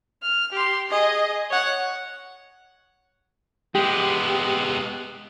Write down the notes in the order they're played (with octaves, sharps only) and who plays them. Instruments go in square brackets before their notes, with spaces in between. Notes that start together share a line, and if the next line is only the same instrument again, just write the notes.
[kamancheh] F6
G4 C6
G#4 D#5
C#5 F#5
[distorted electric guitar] G#3 B3 [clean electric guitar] G4